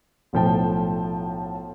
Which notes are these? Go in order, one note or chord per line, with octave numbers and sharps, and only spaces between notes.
B1 A2 F3 C5 G5 A5